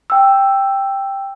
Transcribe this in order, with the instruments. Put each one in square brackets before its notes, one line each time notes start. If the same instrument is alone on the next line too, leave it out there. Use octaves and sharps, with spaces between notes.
[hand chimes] G5 E6